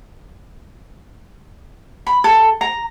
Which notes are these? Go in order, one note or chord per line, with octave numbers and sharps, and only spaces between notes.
B5
A4
A#5